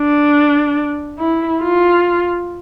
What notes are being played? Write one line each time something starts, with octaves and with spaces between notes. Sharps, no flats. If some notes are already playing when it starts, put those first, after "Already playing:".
Already playing: D4
E4
F4